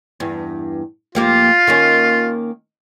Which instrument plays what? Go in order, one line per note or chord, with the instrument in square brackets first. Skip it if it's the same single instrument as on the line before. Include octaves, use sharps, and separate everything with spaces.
[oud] E2 G2
[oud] F2 A#3 G4 [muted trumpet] F4
[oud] D#3 A#3 C#4